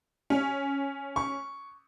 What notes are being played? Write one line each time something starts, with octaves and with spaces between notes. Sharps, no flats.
C#4
C#6